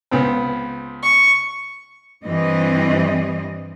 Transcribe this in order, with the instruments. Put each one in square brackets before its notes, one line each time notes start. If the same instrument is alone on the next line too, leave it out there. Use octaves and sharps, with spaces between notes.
[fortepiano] C#2 B3 C4
[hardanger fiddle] C#6
[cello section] G2 E3 G3 C4 D#5